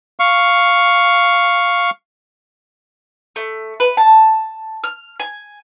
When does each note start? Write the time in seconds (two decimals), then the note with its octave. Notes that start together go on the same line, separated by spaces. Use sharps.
0.20 F5 C#6
3.36 A3
3.80 B4
3.97 A5
4.84 F6
5.20 G#5